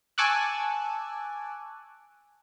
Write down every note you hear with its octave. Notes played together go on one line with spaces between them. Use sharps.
G#5 A5 C#6 D6 E6 F#6